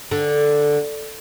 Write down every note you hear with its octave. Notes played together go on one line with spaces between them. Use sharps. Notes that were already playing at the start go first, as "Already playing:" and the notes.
D3